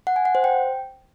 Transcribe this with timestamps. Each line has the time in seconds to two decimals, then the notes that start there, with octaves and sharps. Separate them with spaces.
0.07 F#5
0.16 G#5
0.25 F#5
0.35 C5
0.44 G5